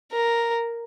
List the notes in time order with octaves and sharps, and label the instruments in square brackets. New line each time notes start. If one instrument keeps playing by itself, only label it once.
[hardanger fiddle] A#4